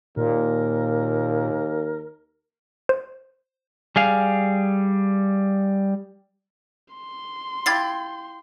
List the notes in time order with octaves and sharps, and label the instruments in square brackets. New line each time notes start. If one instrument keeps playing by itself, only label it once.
[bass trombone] D#2 [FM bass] A#2 [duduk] A#4
[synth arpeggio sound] C5
[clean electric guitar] G3 G#4 F5
[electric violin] C6
[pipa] E4 F4 G4 [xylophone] G#6 A6 C7